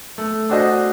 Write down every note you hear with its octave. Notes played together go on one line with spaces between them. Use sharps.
A3
D4 F#4 C5 D#5